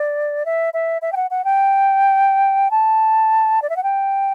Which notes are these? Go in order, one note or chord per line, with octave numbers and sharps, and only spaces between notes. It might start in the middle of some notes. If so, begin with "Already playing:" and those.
Already playing: D5
E5
E5
E5
G5
F#5
F#5
G5
A5
D5
E5
F#5
G5